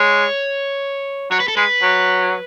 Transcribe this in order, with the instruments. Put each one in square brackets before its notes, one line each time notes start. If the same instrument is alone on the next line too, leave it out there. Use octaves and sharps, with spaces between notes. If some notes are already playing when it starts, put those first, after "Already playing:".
Already playing: [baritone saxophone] G#3 [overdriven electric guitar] C#5
[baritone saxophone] F#3 [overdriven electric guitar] C#5
[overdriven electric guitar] B4
A4
[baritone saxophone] G#3 [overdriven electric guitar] B4
[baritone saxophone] F#3